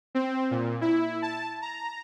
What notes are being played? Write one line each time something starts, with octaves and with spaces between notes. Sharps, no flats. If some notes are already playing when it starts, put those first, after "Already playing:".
C4
A#2
E4
A5
A#5